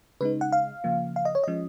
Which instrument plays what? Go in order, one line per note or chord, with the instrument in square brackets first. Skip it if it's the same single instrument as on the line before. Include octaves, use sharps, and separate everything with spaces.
[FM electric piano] C#3 G#3 D#4 B4
F#5
F5
C#3 F3 A#3
F5
D#5
C#5
F3 G#3 C#4 D#5